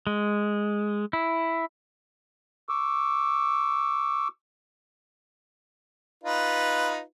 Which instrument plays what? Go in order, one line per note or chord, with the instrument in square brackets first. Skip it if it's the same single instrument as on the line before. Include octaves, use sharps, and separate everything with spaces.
[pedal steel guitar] G#3
E4
[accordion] C#6 D6 E6
[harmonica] D#4 F4 B4